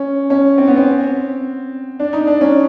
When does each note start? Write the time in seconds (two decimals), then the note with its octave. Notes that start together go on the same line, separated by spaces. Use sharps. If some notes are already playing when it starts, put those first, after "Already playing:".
Already playing: C#4
0.30 C#4
0.58 C4
0.68 B3
0.77 C4
2.00 D4
2.13 D#4
2.27 D4
2.41 C#4